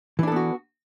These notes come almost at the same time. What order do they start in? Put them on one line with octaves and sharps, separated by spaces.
E3 D4 A4 B3 F#4